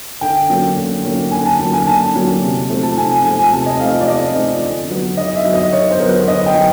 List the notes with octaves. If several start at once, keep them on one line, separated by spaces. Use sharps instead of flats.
D3 G5
F#3 A#3 C#4
D3
F#3 A#3 C#4
D3 G#5
A5
F#3 A#3 C#4
G#5
D3 A5
F#3 A#3 C#4
C3
F3 A3 C4
A5
C3 G#5
F3 A3 C4 G#5
C3 A5
D#5
F3 A3 C4 F5
D5
C3 D#5
F3 A3 C4
D3
F#3 B3
D3 D#5
E5
F#3 B3
D#5
D3 C#5
C5
F#3 B3 A#4
B4
D3 D#5
G5
F#3